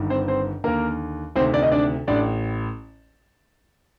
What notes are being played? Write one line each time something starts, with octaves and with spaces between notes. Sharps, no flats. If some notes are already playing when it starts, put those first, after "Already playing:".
Already playing: G1 G2 D#3
C4 C5
C4 C5
D#2 D3 A#3 A#4
D2 C3 D#3 C4 C5
D4 D5
D#4 D#5
D4 D5
A1 A2 D4 D5